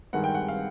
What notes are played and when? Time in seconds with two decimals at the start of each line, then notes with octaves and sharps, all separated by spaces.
0.13 G2 D#3 G#3 F#5
0.24 G5
0.34 F#5
0.48 F5